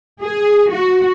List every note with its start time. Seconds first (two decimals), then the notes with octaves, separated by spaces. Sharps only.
0.22 G#4
0.71 F#4